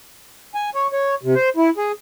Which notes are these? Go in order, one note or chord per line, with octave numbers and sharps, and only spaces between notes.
G#5
C#5
C#5
C3
C5
E4
G#4